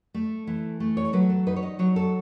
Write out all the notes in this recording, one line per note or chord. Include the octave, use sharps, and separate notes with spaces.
A3
E3
A3
C#5
F#3 B4
A4
D#4 B4
C#5
D#5
F#3 C#5
A4